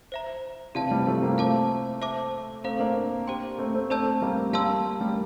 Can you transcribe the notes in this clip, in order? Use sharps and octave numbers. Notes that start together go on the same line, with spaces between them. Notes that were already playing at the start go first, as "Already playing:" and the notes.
C5 E5 A#5
C3 E3 G4 D5 F5 A5
E3 G3
F3 A3
G3 A#3
A3 C4 F5 A5 D6
C5 E5 A5 D6
A3 C4 A4 C5 F5 A#5
A#3 D4
G4 C5 G5 C6
A3 C4
A3 C4
A3 C4 A4 D5 A5 E6 G6
G3 A#3
G3 A#3 F5 A5 C6 E6
G3 A#3